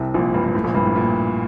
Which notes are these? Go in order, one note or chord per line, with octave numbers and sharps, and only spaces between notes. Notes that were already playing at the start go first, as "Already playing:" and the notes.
Already playing: C2 C3
A#1 A#2
G2
G2
A2
A#1 A#2
G2
A2
A#2